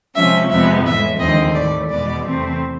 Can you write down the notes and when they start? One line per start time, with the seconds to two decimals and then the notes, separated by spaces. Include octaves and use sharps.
0.15 C3 F3 G#3 C#4 E5
0.49 F2 C3 F3 G#3 B3 E5
0.85 A2 E3 G#3 E5
1.19 D#2 D3 F3 G#3 C4 D#5
1.54 A2 E3 A3 D5
1.88 E2 B2 G#3 B3 D5
2.23 E2 C3 E3 A3 C4